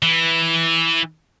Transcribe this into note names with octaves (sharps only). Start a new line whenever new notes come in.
E3